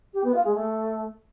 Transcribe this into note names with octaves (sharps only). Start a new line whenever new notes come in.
G4
B3
F4
G#3
A3